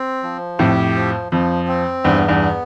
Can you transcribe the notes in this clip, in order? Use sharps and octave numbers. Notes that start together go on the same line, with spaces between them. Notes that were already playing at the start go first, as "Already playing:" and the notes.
Already playing: C4
F3
F2 A2 G4
F3
F2 F3
C4
E2 G2 B3
E2 G2
B3